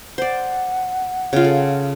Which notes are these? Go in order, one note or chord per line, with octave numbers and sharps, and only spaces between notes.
C5 D5 F#5
C#3 F4
A4